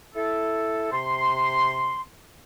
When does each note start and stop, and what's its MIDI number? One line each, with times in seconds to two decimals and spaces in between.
0.15 0.90 64
0.15 0.90 69
0.92 2.00 48
0.92 2.00 84